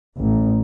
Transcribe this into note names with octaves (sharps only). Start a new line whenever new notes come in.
A1